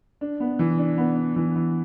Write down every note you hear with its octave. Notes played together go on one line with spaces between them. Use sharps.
D4
B3
E3
D4
B3
D4
E3
E3